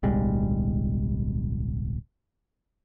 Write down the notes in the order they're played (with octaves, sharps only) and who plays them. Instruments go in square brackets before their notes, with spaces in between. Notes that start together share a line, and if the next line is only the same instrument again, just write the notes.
[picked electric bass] D1 B1 G3 G#3